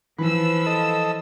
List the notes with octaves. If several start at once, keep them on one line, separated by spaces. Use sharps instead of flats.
E3 F3 B4 E6
A4 D#5